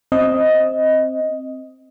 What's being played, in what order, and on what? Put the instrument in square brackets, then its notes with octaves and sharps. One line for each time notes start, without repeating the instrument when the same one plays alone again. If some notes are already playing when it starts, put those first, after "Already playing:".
[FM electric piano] C4 D#5